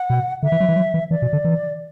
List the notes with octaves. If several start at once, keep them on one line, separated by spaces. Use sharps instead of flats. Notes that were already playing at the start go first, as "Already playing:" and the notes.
Already playing: F#5
B2
D3 E5
E3
F#3
E3
F#3
E3
E3 D5
B2
D3
E3